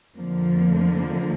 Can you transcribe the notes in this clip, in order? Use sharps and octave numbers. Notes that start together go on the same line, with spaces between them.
F2 D3 F3 A#3